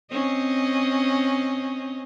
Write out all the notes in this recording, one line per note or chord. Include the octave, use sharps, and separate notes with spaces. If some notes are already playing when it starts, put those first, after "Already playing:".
C4 C#4 D#5